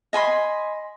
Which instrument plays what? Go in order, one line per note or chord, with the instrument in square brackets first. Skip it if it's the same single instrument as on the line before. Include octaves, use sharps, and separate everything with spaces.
[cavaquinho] D#5 G#5 B5 C6